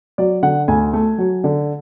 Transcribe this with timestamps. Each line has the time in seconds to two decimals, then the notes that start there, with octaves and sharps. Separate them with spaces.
0.18 F#3 D5
0.43 D3 F#5
0.68 D2 G#5
0.93 A3
1.18 F#3
1.44 D3